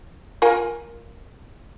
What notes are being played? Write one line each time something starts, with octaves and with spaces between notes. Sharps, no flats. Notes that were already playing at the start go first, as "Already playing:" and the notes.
F4 A#4 G#5